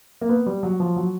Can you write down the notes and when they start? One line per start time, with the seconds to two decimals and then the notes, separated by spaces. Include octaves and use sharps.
0.21 A#3
0.29 B3
0.46 G3
0.63 F#3
0.80 F3
0.96 F#3